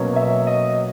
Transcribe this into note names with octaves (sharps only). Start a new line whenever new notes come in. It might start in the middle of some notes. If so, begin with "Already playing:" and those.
Already playing: B2 F#3 A#3 C#4
E5
D#5